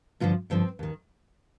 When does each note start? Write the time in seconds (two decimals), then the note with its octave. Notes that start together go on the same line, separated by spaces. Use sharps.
0.20 G2 D3 F3 F4
0.50 G2 D3 F3 C4
0.79 D#2 D#3